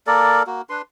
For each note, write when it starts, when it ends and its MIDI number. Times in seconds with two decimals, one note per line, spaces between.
0.07 0.43 58
0.07 0.43 69
0.07 0.43 70
0.07 0.43 74
0.47 0.62 58
0.47 0.62 66
0.70 0.82 62
0.70 0.82 71
0.70 0.82 84